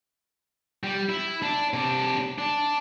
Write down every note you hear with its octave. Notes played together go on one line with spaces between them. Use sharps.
G3
E4
D4
C3 D4
D4